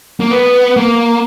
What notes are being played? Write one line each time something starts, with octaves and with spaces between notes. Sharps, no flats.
A#3
B3
A#3